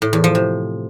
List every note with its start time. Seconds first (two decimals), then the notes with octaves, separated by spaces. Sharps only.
0.02 A2
0.13 E2
0.24 F3
0.35 C3